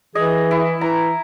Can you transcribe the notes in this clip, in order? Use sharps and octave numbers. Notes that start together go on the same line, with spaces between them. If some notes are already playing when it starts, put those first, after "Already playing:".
E3 G#4 D#5
E4
E3 A#5